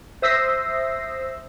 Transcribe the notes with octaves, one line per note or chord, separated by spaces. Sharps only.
C5 E5 D#6 E6 A#6 C7